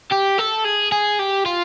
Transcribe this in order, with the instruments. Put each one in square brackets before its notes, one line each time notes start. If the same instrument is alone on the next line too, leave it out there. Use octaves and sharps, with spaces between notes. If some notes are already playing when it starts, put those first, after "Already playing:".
[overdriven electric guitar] G4
A4
G#4
G#4
G4
F4